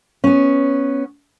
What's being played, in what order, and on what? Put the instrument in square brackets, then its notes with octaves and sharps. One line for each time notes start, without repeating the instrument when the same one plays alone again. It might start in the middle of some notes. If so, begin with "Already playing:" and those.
[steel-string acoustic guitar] B3 C#4